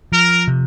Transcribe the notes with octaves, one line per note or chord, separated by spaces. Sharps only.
F3 A#4
C3